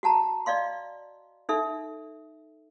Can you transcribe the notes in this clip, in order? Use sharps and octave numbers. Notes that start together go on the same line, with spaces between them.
F#4 F#5 A5 A#5
D5 D#5 F5 C6
D#4 A4 E5